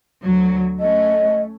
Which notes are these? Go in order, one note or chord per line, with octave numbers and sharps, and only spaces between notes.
D2 F#3
A3 C#4 D#5